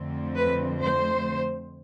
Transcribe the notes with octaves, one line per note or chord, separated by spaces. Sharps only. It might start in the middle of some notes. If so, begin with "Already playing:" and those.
Already playing: F2 D3 F3 A3 C4
B4
C5